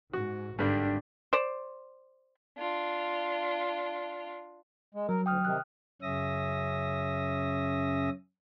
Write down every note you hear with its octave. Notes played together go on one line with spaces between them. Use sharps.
G#2 F#4
G#1 G2 D3 G3 D4
C5 D5
D4 F4
G#3
F#3 A#4
D2 G5 D#6 F6
C3 D#3 F#6
F#2 C#3 C#4 E5 D#6 A#6